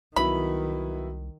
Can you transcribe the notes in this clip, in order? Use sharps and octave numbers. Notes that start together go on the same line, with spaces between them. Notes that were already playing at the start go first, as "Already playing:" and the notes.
C2 D#3 F#3 B3 E4 B5